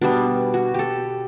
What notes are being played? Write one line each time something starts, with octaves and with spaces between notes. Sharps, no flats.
B2 G3 B3 D4
F#4
G4 A4